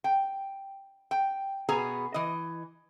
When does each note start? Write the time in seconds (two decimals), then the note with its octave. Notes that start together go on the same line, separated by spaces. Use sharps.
0.04 G5
1.11 G5
1.69 B2 B3 G#4 G#5 A#5
2.14 E3 D#5